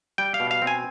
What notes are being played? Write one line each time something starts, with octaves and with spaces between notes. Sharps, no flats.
G3 G5
F5
B2
F5
C4
G#5